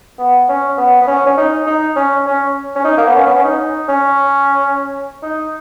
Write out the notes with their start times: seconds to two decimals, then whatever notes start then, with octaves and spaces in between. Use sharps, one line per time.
0.19 B3
0.49 C#4
0.77 B3
1.01 B3
1.07 C#4
1.26 C#4
1.38 D#4
1.66 D#4
1.96 C#4
2.26 C#4
2.75 C#4
2.85 D#4
2.98 A#3
3.07 B3
3.15 C#4
3.26 B3
3.35 C#4
3.44 D#4
3.88 C#4
5.23 D#4